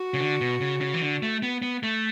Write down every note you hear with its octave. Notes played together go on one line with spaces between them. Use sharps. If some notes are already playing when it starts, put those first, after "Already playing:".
Already playing: F#4
C#3
D3
B2
C#3
C#3
E3
D3
A3
B3
B3
A3